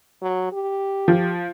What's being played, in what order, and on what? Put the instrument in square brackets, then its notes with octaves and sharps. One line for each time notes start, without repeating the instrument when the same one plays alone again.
[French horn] F#3
G4
[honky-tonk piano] F3